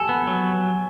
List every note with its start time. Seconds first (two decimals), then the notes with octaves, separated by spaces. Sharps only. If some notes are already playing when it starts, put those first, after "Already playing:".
Already playing: A4 G#5
0.09 B3
0.27 F#3